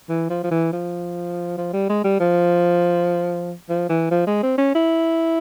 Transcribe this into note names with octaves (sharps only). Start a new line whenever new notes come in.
E3
F3
F3
E3
F3
F3
G3
G#3
G3
F3
F3
E3
F3
G#3
C4
C#4
E4